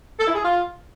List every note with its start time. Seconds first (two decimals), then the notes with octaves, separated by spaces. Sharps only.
0.19 A4
0.27 E4
0.35 G#4
0.43 F4